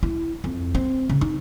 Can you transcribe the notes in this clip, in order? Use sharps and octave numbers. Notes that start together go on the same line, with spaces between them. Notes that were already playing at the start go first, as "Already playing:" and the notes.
E4
F2
C4
C#3
D#4